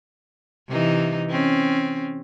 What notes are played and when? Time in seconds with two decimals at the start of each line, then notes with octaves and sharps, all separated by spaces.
0.69 C3 E3 D#4
1.30 C4 C#4